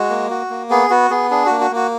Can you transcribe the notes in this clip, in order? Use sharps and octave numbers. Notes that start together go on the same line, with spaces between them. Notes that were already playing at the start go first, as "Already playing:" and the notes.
Already playing: G#3 F#4
A#3
F#4
A#3
B3 G#4
B3 F#4
B3 G#4
D4 G#4
A#3 F#4
F#4
A#3 F#4